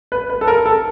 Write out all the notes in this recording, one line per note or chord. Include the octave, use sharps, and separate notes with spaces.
B4
B4
A4
A#4
A4